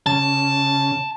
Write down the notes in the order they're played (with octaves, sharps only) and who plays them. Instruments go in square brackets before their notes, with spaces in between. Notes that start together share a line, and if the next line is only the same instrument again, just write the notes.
[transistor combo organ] C#3 [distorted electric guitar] A5